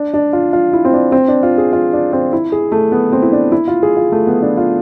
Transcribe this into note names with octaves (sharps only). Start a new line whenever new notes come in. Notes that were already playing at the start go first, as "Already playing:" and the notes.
Already playing: D4
D4
F4
F4
E4
C4
D4
C4
D4
F4
G#4
F4
D4
C4
E4
G#4
A3
B3
C4
E4
D4
E4
F4
G#4
F4
A3
B3
D4
F4